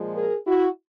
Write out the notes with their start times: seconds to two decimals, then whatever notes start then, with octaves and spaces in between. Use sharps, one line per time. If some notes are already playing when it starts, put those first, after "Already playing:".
Already playing: A#2 F3 G#3
0.15 G#4 A#4
0.47 E4 F#4